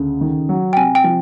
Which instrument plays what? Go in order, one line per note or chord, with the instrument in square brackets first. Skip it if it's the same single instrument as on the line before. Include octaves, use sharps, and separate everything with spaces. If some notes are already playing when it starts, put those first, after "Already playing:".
Already playing: [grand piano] D2 C#3
D#3
F#3
[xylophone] G5
[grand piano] C3 [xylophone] G#5
[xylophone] G5
[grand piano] F3